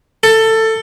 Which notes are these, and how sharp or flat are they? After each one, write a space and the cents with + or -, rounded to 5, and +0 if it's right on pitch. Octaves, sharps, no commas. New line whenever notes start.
A4 +15